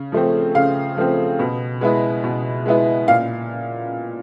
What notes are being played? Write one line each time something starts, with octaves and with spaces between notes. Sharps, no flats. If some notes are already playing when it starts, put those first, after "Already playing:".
Already playing: C#3
F3 A3 C4
C#3 F5
F3 A3 C4
B2
G#3 B3 E4
B2
G#3 B3 E4
A#2 F5